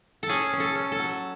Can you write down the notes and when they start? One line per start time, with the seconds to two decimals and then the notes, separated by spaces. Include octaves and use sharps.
0.23 A4
0.29 C#4 G#4
0.53 C#4
0.60 A4
0.75 C#4
0.92 A4
0.99 F#3